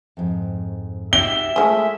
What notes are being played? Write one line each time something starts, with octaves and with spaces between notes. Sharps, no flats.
F2 G#2
D#4 F#4 G4 E5 G7
F3 G#3 A3 G#4 E5